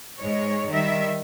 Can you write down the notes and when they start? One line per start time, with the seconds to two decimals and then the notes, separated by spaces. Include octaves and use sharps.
0.19 G#2 G#3 C#5
0.70 D#3 G3 E5